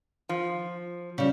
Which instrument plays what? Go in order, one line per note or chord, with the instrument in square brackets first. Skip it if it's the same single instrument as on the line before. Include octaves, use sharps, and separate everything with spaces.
[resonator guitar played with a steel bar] F3
[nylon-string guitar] C#3 G3